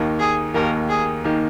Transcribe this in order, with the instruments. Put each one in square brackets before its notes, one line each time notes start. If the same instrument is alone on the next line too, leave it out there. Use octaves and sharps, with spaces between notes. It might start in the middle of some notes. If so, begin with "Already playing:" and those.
Already playing: [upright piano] D#2 D#3 A#3
[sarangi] G#4
[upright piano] D#2 D#3 A#3 [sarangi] A#4
[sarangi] G#4
[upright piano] D#3 A#3